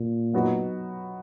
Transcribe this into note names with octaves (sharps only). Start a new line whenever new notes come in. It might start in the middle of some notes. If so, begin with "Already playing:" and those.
Already playing: A#2
F#3 B3 D#4 F#4